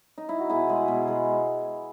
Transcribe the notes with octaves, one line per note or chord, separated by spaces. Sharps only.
D#4
E4
F#4
B2 E4 G#4
G#3
B2
G#3